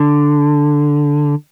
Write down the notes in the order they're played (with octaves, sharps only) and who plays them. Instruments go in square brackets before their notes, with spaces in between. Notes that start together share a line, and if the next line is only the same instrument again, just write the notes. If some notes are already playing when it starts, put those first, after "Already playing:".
Already playing: [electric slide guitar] D3